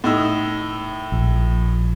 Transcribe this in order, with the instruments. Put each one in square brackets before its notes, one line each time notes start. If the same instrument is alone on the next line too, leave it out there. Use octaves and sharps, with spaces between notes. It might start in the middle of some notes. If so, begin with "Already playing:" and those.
[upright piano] A2 D#4 E6
[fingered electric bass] A#1